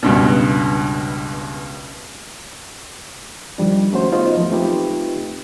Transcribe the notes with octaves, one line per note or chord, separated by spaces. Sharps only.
C#2 G2 B2
D#3 F3 G3 D4
A3 C#4 F#4 C5
B3 D#4 F4 G#4 C5 D#5
F3 F#3 A3
A3 C4 D#4 F4 G4 B4